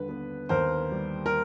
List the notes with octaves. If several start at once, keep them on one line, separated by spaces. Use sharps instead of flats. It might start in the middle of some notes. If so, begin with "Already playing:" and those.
Already playing: D#2 D3 G3 B4
B3
D#2 A#4 C5
G3
A#4